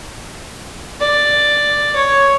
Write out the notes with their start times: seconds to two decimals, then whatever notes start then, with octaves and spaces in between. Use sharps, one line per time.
1.00 D5
1.96 C#5